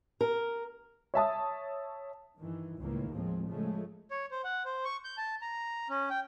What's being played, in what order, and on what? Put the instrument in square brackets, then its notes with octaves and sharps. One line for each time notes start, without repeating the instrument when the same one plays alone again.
[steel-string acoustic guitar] A#4
[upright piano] C#5 E5 A5 D#6
[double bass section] G2 D#3 E3
C#2 A2 D#3 E3 A#3
A1 D#2 F3 G#3 C4
C#3 F3 G#3 A3
[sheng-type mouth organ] C#5
C5
F#5
C5
C#6
G6
A5
A#5
C#4
G5